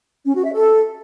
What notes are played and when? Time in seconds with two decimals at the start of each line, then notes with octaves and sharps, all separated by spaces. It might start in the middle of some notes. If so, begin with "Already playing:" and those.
0.24 C#4
0.34 F#4
0.44 E5
0.54 A4